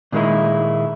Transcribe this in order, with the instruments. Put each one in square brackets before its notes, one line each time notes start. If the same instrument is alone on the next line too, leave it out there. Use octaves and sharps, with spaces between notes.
[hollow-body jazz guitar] A#2 D#3 G#3 A#3 D#4 E4